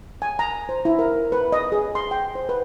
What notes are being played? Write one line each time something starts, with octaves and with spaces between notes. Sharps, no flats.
G#5
A#5
C5
E4
A#4
B4
D#5
G#4
C6
G5
C5
B4